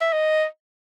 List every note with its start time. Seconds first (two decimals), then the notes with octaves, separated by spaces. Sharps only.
0.01 E5
0.12 D#5